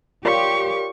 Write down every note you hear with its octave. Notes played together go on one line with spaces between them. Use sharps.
F4 G4 A#4 C#5 D5 C#6